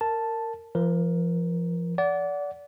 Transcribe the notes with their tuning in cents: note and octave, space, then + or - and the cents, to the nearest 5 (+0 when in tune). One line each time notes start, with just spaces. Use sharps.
A#4 -20 A5 +0
F3 -30 A#4 +20
D5 -25 F#5 +0